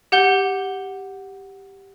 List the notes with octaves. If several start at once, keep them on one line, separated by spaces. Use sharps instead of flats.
G4 F#5 G6 G7